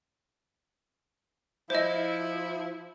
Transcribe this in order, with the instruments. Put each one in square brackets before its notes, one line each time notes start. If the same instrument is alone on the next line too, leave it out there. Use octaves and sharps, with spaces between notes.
[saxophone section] F3 E4 [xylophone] C5 D#5